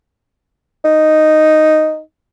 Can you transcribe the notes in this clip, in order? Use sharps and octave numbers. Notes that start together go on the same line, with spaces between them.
D#4